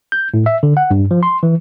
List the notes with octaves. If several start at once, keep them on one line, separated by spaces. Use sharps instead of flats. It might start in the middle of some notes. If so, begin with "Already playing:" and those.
G6
A2
E5
D3
F#5
G2
F3
C6
E3